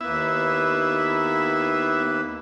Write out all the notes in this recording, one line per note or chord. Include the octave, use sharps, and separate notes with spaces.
D#2 A#3 B3 E4 B4 E5